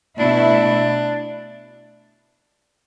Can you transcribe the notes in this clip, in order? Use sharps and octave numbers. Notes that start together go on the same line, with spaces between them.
B2 A3 D4 E4